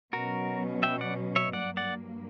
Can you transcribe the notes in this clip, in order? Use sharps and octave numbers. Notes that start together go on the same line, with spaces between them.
B2 F#3 C#4 F#4 A#4
E5 G5
D5 F#5
C#5 E5
G2 F#3 A#3 D5 F#5
D5 F#5